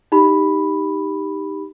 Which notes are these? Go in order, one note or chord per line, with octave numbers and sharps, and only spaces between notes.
D#4 G4 B5